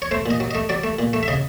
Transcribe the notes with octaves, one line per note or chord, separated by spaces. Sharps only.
C#5
A3 C5
A#2 D#5
F#3
A3 D#5
F#3 D5
A3
A#2
A3
E5
C#3 D#5